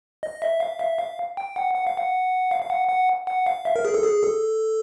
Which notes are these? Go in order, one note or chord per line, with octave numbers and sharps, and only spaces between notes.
D#5
E5
F5
E5
F5
G5
F#5
F#5
F5
F#5
F5
F5
F#5
F#5
F#5
F5
E5
A#4
G#4
A4
G#4
A4